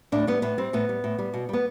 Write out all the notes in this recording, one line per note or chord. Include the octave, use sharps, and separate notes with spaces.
A2 D4
G3 B3
A2 B3
G3 C4
A2 B3
G3
A2
G3
B2
G3 B3